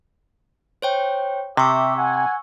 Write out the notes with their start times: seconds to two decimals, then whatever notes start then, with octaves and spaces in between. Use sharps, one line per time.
0.82 C5 C#5 G5
1.57 C3 G4 E5 C#6 E6
1.97 F#5 G#5